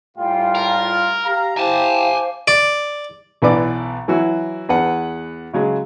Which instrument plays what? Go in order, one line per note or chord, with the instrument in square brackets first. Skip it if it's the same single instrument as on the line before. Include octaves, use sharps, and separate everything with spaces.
[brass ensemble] A2 G3 F4 [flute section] F5 G5 G#5
[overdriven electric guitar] A#4
[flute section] F6
[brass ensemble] G4 F5 A#5
[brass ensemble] E4 G4 [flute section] C5 F5 D6 [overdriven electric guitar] G#5 A5
[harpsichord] D5
[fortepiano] B1 E3 B3 B4 D5 D6
E3 F#3 E4 F#4
E2 B4 F#5
C#3 F#3 G#3